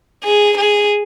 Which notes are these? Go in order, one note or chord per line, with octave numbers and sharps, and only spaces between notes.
G#4
G#4